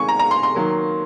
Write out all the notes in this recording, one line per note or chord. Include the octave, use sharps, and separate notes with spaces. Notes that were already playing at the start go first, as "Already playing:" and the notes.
Already playing: C3 D#3 G#3 G#5 C#6
A#5
A#5
C6
C6
D#3 F#3 A#3